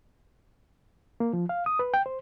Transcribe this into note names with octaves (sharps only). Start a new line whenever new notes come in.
A#3
F3
F5
D#6
B4
G5
C5